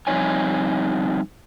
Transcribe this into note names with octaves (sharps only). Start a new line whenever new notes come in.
F3 G3 C4 D#4 C#5 G#5